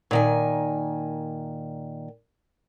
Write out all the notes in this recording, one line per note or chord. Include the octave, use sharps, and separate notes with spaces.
A#2 D#3 G#5